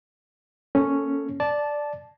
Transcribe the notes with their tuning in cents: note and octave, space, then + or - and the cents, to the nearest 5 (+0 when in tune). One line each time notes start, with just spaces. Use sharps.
A#3 +0 C#4 +0 A4 +0
D5 +0 A5 -10